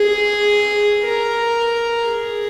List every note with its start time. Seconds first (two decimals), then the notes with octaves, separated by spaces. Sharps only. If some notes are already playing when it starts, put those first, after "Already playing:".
Already playing: G#4
1.04 A#4
2.04 G#4